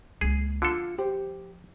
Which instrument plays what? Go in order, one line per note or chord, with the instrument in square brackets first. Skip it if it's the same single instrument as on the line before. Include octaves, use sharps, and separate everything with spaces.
[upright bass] C#2 A#3 [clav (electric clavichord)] G#4
[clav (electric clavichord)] D3 A4 [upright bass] F3 [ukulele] F4
[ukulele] G4 C5